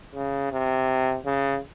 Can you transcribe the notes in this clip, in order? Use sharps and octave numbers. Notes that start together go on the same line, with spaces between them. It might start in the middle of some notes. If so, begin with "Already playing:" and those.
C#3
C3
C#3